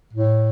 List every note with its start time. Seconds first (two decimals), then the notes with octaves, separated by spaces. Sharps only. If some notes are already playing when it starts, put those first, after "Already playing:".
0.13 A2